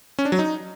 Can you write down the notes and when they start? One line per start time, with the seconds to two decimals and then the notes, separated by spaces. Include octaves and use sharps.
0.19 C#4
0.25 D4
0.32 F#3
0.39 D#4